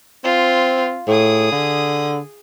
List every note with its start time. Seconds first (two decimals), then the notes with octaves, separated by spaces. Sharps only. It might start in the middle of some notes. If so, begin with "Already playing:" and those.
0.24 C4 F4
1.08 A2 G#4 D#6
1.52 D3